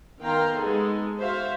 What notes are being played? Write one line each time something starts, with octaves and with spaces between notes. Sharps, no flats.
D#3 B3 F5 G5 A#5 C6
G#3 B3 D#4 G#4 A4
F#4 C5 E5 F5